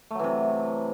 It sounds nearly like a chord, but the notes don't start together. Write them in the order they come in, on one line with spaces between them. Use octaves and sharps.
A3 F#3 E3 C3